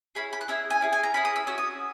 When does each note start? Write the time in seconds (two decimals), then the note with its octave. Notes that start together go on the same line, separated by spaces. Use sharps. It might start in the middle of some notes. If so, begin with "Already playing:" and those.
0.15 C#4 E4 G#4 B5
0.33 B5
0.41 F#6
0.48 C#4 E4 G#4 E6
0.70 G#5
0.81 C#4 E4 G#4
0.93 G#5
1.03 A#5
1.14 C#4 E4 G#4 B5
1.25 D#6
1.36 E6
1.47 C#4 F#4 E6
1.58 D#6